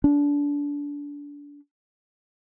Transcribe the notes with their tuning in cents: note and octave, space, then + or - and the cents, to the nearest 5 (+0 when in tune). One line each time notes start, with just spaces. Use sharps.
D4 -25